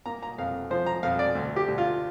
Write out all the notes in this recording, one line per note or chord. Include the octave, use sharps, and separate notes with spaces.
A#3 A#5
A#5
F2 F5
F3 C5
A#5
F2 F5
D5
D2
G4
D2
F4